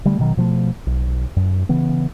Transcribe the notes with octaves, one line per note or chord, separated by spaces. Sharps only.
D3 G3 A3
B2 D#3 F#3
B2 F3 G3 A3
B1
F#2
C#3 E3 B3